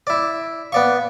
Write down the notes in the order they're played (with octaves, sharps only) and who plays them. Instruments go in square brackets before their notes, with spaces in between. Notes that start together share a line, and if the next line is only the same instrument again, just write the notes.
[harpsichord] E4 D5
[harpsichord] B3 D5 C#6 [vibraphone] F5